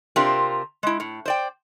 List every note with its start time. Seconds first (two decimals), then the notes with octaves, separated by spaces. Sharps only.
0.16 C3 C4 D4 F4 G4 A#4
0.83 G#3 E4
1.00 A2
1.26 C5 D5 G5